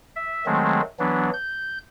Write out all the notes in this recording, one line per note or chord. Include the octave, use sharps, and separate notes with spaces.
E5
D#3 F#3 G#3 A3 C4
E3 F#3 B3 D4
G6